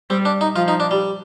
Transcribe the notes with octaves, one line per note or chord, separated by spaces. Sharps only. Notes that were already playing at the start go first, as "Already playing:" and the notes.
G3 C4
D4
D#4
F3 F4
D#4
D4
G3